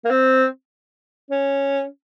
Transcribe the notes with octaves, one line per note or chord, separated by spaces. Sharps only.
A#3
C4
C#4